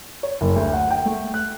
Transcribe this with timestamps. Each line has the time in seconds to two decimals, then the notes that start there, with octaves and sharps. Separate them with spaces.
0.23 C#5
0.41 F#1
0.56 D2
0.73 F#5
0.91 G5
1.06 A3
1.34 F#6